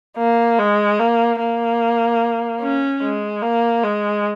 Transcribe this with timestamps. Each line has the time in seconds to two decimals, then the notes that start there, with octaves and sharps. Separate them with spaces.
0.17 A#3
0.59 G#3
0.99 A#3
1.40 A#3
2.61 C#4
3.02 G#3
3.42 A#3
3.83 G#3